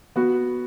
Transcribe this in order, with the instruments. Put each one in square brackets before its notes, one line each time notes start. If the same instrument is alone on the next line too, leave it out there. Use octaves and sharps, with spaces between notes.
[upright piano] B3 F#4